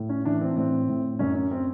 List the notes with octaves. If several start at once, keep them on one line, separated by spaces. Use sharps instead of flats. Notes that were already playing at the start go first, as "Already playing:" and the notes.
Already playing: A2
C#4
E3 D4
C4
A2 C4
A2
F#2 C#4
C#4
C4